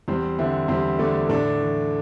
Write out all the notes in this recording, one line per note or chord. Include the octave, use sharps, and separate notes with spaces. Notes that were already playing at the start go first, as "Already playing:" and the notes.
E2 G3 C4
D3 C4 E4
E2 G3 C4
D3 A3 D4
A2 A3 D4
E3